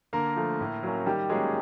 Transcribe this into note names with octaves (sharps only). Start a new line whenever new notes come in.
D3 A#3 A#4
F3 A3
A2
F#3 A#3 C#4
D#3 G3 G4
F#3 G#3 A#3 C#4 G#4